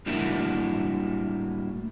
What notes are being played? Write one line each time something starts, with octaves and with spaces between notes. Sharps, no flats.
A2 G3 A#3 D4 E4 F#4